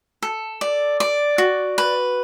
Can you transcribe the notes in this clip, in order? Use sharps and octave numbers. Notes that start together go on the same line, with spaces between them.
A4
D5
D5
F#4
B4